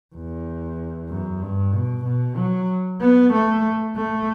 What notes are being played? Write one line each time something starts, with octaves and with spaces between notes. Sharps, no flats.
E2
F#2
G2
B2
B2
F#3
B3
A3
A3